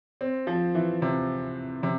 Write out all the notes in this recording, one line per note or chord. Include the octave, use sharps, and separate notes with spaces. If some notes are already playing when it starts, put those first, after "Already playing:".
C4
F3
E3
C3
C3